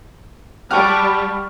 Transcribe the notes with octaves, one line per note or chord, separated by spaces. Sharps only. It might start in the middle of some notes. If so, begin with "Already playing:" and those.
G3 G4 F#5 A5 B5 C#6 D6 F6